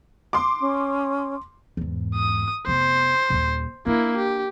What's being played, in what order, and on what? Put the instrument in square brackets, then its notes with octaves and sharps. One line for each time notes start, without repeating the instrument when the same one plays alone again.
[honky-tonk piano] C6 D6
[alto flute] C#4
[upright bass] E2 G#2
[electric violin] D#6
[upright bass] F1 B3 [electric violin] C5
[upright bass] D#1 D#2
[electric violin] A#3 E4 [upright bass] D4
[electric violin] G4